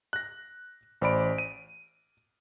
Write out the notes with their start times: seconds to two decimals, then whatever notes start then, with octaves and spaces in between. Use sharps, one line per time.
0.13 F#6 A#6
1.01 A1 C5 D5 B5 D7
1.38 D#7